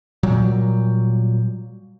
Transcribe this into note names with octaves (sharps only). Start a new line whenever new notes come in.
A#2 F#3 G3